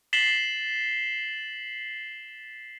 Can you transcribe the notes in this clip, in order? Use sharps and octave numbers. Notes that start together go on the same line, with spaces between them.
A6 B6 C7 E7 F#7 G7